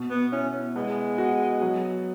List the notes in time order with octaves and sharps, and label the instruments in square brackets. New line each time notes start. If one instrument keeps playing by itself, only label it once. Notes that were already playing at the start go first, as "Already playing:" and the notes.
Already playing: [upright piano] B2
[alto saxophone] B3
[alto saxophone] C#4 [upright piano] E4
[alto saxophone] G#3 [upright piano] B3
[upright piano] F#4
F#3